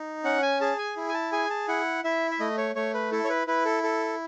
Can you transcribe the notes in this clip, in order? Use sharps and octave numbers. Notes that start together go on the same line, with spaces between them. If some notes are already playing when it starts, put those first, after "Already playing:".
Already playing: D#4
C#4 F#5
G#5
G#4 A5
G#5
E4
G#5
A5
G#4 G#5
A5
E4 F#5
E4 E5
E5
A3 D#5
C#5
A3 C#5
B4
E4 A4
C#5
B4
E4 B4
A4
A4